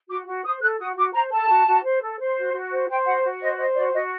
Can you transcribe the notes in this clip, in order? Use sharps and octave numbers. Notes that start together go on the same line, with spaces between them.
F#4 D6
F#4
C5 D#6
A4 F#6
F#4 D#6
F#4 D6
C5 A#5
A4 A5
F#4
F#4
C5
A4
C5
F#4
F#4
C5
C5 G5
F#4 F#5
F#4
C5 D#5
C5 D#5
F#4 D5
F#4 D#5